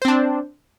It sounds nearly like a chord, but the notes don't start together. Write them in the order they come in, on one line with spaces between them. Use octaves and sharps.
C5 C4 D4